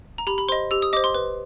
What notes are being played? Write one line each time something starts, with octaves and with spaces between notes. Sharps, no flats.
A#5
G4 B5
B5
C5 D#5 C6
G4 E6
D#6
C5 D#5 D6
C6
B4